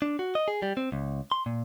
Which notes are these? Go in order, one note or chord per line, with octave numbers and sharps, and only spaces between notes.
D4
F#4
D#5
G#4
G3
C4
C#2
C6
A#2